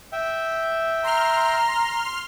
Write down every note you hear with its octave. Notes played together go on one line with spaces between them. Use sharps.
E5 G5
A#5 C6 F6